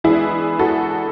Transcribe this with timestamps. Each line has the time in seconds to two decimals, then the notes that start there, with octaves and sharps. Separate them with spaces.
0.04 E3 G#3 B3 D4 E4 G#4
0.59 F#4 A4